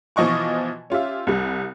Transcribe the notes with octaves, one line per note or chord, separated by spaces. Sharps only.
B2 E3 F3 D#5 C#6 D6
C#4 F4 G4 E5
C2 G3